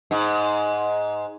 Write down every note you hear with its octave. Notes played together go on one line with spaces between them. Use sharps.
G#2